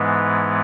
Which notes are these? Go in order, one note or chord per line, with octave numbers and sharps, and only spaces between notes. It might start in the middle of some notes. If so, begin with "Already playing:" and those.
Already playing: G#2 E3 G#3 B3